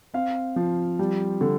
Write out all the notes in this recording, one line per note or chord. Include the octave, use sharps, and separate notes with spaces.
C4 F5
F3
G3
D3